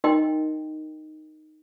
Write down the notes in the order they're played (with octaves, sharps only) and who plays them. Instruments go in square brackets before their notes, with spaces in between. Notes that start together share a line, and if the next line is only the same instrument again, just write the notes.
[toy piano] D#4 A#4 D#5 G5 C6